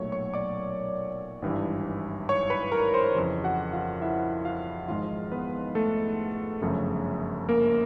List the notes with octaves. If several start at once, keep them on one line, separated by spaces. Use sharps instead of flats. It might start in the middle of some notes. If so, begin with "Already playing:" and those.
Already playing: B1 A#2 F#3 A3 C#5 C#6
C#5 C#6
D5 D6
G#1 G2 E3
C#5 C#6
B4 B5
A#4 A#5
C5 C6
F2 C#3 E3
F#4 F#5
F4 F5
E4 E5
F4 F5
G#1 G#2 F3 G#3 F4 F5
B3 B4
A3 A4
G1 F#2 C#3 F3 A3
A#3 A#4